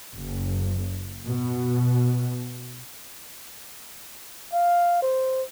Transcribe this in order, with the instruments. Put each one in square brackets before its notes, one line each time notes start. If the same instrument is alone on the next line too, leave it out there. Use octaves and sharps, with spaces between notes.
[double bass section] F#1
B2
[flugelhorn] F5
C5